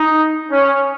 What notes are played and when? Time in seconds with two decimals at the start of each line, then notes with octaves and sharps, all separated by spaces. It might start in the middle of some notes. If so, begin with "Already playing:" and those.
Already playing: D#4
0.51 C#4